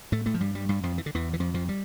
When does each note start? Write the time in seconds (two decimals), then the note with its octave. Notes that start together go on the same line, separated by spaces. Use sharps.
0.12 A2 A3
0.26 A2 A3
0.34 F3
0.40 G2 G3
0.55 G2 G3
0.69 G2 G3
0.83 F2 F3
0.98 E3
1.06 D3
1.14 E2 E3
1.33 E3
1.40 F2 F3
1.54 F2 F3
1.69 G3